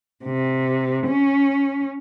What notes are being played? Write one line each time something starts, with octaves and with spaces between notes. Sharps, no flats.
C3
C#4